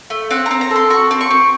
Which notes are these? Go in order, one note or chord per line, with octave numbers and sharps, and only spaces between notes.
A3
C4 F#5
A#5
C4
A#5
A4
C6
F#4 C#6
C4
C#6
C4